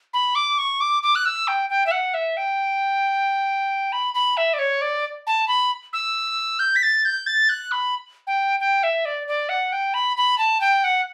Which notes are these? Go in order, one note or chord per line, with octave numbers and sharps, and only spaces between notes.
B5
D6
C#6
D6
D6
F#6
E6
G5
G5
E5
F#5
E5
G5
B5
B5
E5
D5
C#5
D5
A5
B5
E6
G6
B6
A6
G6
A6
F#6
B5
G5
G5
E5
D5
D5
F#5
G5
B5
B5
A5
G5
F#5